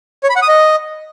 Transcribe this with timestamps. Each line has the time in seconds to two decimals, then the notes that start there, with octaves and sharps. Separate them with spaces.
0.24 C#5
0.30 B5
0.36 F#5
0.42 D#6
0.48 D#5